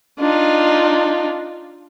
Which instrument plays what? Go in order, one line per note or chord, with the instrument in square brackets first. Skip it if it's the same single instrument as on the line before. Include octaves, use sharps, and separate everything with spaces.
[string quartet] D4 D#4 F4